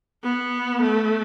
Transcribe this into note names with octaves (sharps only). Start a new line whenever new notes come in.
B3
A3